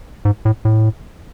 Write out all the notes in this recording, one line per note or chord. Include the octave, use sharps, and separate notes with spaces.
G#2
A2
A2